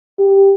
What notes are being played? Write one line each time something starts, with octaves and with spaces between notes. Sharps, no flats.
G4